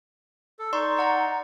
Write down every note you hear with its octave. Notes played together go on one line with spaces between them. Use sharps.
A4
D#4 D5 C6 C#6
D5 F#5 A#5